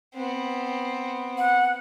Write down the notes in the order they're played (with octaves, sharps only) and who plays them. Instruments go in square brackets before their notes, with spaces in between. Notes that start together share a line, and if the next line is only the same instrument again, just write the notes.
[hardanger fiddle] B3 C4
[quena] F#5